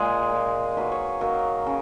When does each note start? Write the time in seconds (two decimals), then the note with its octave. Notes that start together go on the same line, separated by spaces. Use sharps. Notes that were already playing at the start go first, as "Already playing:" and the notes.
Already playing: A#2 G#3 G#4
0.32 A#2 G#3
0.76 D#3 F#3 A#3 B4
0.92 C#5
1.21 D#3 F#3 A#3 A#4
1.66 C#3